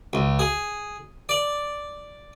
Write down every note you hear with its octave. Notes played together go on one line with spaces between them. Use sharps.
C#2
G#4
D5